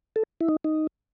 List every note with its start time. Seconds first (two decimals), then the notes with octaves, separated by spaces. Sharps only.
0.16 A4
0.41 E4
0.48 D#4
0.64 D#4